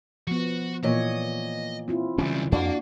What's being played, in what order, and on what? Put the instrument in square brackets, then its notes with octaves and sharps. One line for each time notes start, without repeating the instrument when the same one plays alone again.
[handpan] F3 B3 [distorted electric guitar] F#4
[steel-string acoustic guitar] A#2 [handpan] E3 C#5 [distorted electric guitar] D#5
[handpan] C4 E4 F4
[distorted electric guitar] C#2 G3 [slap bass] E3 C#4
[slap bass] F2 [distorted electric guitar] A#3 F5 [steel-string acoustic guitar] D4 F#4